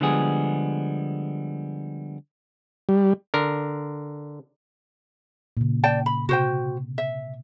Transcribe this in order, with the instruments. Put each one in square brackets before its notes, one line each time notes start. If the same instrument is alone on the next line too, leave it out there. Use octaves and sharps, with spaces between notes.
[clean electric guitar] D3 F3 G3 G#3 B3 G#4
[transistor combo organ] G3
[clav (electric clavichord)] D3 A#4
[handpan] A#2 C#3
[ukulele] D5 G5 A5
B5
[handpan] C3 [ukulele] F#4 C5 G5
[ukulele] E5